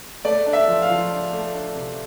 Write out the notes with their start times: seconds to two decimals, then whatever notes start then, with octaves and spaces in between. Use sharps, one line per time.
0.25 A3 D5
0.46 D4
0.53 E5
0.68 F3
0.82 F5
0.89 F3
1.11 D4
1.32 A3
1.54 D4
1.75 C3